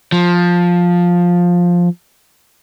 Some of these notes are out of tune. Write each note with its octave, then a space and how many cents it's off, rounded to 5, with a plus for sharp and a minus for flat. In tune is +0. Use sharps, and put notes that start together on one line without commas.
F3 +10